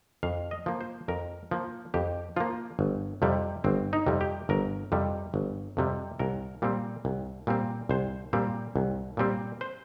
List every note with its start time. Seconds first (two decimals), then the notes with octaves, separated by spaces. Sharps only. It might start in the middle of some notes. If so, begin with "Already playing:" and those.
0.23 F2 F5
0.51 D#5
0.66 F3 A#3
0.81 C5
1.08 F2 A#4
1.51 F3 A#3
1.94 F2 G4
2.36 F3 A#3 F4
2.79 G1
3.22 F2 C3 G3
3.64 G1 C4
3.93 D#4
4.06 F2 C3 G3
4.21 G4
4.49 G1 A#4
4.92 F2 C3 G3
5.34 G1
5.77 F2 C3 G3
6.19 C2 A#4
6.62 A#2 G3 C4
7.05 C2
7.47 A#2 G3 C4
7.89 C2 C5
8.33 A#2 G3 C4
8.76 C2
9.17 A#2 G3 C4
9.61 C5